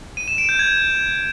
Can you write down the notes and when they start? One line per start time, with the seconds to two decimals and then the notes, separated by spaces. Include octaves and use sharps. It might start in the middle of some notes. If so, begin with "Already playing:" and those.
0.17 D#7
0.28 E7
0.38 D7
0.49 G6
0.59 G#6